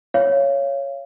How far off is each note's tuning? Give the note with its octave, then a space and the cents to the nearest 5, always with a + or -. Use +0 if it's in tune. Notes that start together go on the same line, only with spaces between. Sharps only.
C#5 +0 F5 -25